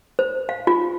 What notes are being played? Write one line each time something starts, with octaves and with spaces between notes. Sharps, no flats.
C5
F5
F4